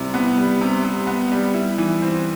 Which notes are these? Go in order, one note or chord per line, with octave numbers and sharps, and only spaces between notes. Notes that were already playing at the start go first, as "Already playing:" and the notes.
Already playing: C3 G3 E4
B3
G3
C3
C3
B3
G3
E4
E3
C4